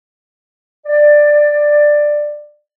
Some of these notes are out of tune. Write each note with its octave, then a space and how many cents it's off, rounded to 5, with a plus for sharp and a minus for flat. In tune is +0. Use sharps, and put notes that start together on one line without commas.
D5 +10